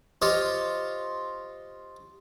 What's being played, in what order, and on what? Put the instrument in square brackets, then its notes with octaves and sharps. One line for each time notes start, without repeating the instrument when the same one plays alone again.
[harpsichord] F4 G4 C5 C#5 D#5 F5